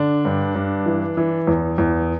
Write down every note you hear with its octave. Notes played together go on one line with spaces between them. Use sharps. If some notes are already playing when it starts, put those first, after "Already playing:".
Already playing: D3 D4 D5
G2
G2
E3
E3
E2
E2